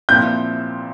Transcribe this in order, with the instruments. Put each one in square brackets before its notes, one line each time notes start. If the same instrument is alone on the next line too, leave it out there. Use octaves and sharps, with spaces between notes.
[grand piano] A#2 F3 C4 E4 [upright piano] G6